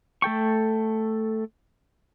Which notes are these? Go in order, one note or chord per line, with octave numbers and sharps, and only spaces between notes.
A3 A4 G5 C#6